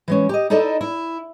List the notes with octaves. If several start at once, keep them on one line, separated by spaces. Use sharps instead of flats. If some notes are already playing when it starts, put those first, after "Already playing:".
E3 G#3 C#4
G4 D#5
D#4 E4 A4 D5 D#5
E4